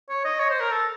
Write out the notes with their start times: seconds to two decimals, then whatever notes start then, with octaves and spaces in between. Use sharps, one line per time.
0.09 C#5
0.25 D#5
0.39 C#5
0.50 C5
0.61 A#4
0.71 A4